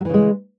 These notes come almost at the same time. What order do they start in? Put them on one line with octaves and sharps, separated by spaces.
F#3 E3 C#3 G#3